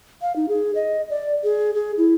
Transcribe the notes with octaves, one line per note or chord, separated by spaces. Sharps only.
F5
D#4
G#4
D#5
D5
G#4
G#4
E4